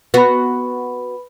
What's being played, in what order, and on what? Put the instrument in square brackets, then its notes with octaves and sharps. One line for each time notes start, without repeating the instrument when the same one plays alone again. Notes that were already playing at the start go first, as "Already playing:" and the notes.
[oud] B3 F#4 [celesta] B4 B5